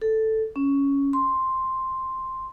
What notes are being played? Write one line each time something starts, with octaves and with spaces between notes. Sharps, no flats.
A4
C#4
C6